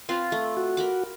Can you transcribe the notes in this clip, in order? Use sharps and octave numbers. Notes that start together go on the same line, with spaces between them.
C4 F4 B4
A3
F#4
A#4 B5 D6